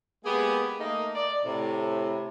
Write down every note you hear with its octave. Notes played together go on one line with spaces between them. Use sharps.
G#3 A#3 B3 G4 G#4
A3 A#3 D#4
D5
A2 C3